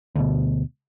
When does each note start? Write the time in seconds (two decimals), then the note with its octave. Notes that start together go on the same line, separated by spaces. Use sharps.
0.16 D2 B2